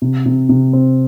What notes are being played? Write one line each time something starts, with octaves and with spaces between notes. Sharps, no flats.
C3
C3
C3
C4